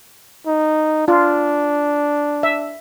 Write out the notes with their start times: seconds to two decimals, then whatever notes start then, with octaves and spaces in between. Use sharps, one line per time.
0.47 D#4
1.08 D4 F4
2.43 E5